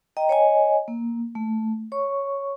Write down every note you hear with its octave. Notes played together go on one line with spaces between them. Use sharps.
D#5 G5 A#5
C#5 D#5 G#5
A#3
A3
C#5 C#6